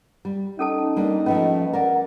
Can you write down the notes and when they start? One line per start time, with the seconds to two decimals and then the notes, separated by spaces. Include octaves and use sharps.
0.25 G3
0.59 C#4 D#4 A4 A5
0.96 G3 A#3 D4
1.26 F3 A3 C#4 B4 D#5
1.73 A#4 D5 F#5